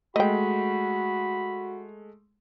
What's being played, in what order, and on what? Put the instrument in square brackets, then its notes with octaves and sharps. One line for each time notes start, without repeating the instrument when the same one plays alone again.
[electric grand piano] G#3 A3 [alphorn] F#4 [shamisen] D#5 G5 [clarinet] B5